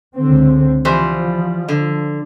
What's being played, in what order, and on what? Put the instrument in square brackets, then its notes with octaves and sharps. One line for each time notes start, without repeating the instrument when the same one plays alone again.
[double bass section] C#2 D3 C4
[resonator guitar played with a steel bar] E3 G3 C5 [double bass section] F3
[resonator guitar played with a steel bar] D3